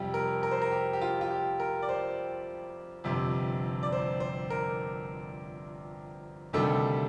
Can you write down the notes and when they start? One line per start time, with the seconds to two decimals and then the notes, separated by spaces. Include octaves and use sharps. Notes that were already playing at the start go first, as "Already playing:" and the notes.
Already playing: F2 C3 G3 G4
0.14 A#4
0.43 A#4
0.51 C5
0.62 A#4
0.71 G4
0.93 G4
1.01 F4
1.21 F4
1.31 G4
1.60 A#4
1.82 D5
1.89 C5
3.04 G1 F2 C3
3.83 D5
3.92 C5
4.20 C5
4.50 A#4
6.53 D2 C3 D#3 G3 A4